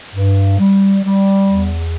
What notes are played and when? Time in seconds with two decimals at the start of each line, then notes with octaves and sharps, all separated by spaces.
0.14 G2
0.59 G3
1.03 G3
1.47 E2